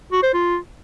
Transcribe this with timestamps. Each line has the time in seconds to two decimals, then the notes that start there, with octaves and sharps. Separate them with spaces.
0.12 F#4
0.23 C5
0.34 F4